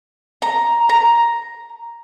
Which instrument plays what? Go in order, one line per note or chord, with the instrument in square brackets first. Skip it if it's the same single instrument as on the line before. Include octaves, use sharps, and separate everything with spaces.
[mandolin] A#5
A#5